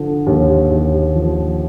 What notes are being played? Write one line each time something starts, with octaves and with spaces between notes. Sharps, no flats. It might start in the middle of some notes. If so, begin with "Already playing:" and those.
Already playing: D3 F3
D#2
D#2
F3